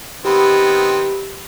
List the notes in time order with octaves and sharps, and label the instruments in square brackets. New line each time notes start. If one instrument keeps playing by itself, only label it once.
[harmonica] D#3 B3 C4 [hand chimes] G4 B5